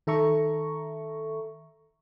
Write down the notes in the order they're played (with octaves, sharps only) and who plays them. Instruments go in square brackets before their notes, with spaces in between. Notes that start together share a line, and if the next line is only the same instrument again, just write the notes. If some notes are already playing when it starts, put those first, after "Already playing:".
[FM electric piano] D#3 A4 E5 A#5 C#6